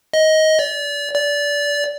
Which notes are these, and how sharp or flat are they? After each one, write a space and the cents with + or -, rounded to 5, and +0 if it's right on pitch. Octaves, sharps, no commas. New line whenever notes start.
D#5 +15
D5 -30
D5 -20